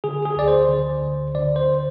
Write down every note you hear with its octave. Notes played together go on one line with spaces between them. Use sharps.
D3 G#4
G#4
D2 D5
C5
D3
D2
D3 D5
C5